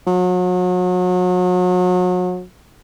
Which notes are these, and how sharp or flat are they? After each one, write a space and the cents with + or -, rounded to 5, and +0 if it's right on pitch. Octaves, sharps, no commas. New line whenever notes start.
F#3 -35